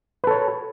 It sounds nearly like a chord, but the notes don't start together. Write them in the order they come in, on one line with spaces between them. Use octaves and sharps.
B4 A4 C#5